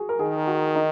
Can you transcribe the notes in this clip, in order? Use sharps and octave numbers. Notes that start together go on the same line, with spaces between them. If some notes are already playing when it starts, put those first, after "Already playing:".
Already playing: F#4 G#4
A#4
D#3 G#4
F#4
D#4